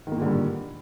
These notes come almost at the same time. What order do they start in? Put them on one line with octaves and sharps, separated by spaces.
D#3 A#3 A#2 D3 G2